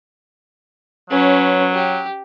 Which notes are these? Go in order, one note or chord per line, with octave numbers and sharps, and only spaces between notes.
F#3 C#4 B4
G4